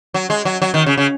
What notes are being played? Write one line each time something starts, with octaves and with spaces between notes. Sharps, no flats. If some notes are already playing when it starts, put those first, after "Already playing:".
F#3
G#3
F#3
F#3
D#3
C#3
C#3